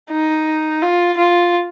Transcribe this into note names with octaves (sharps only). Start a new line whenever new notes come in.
D#4
F4
F4